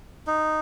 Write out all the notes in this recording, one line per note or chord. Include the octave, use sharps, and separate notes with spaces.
D#4